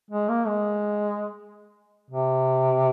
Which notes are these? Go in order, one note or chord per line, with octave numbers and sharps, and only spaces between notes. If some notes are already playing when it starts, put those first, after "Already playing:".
G#3
A#3
G#3
C3